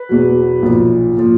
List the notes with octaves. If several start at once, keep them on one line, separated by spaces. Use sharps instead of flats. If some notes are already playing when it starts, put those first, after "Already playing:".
Already playing: B4
E2 B2 F#3
B1 A#2 F3
A#2 F3